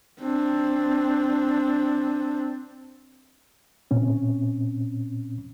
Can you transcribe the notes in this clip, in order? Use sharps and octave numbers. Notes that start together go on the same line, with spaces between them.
C4 D4
A#2 C4 C#4